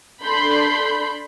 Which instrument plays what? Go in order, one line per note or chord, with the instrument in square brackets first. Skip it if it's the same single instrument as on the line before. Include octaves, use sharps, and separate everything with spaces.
[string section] D4 A4 B5 C6 G6